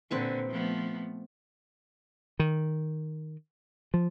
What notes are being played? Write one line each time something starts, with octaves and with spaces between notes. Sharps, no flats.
A#2 D3 C4 B4 C#6
F3 A3 B3
D#3
F3